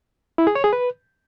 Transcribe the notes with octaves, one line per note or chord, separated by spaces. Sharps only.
E4
G#4
C#5
G#4
B4